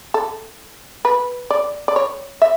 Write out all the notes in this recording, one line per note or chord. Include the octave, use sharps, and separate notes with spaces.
A4
B4
D5
D5
C#5
E5